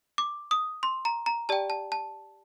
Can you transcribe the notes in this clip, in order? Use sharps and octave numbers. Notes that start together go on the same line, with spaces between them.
D6
D#6
C6
A#5
A#5
G4 D5 G5 A5
A5
A5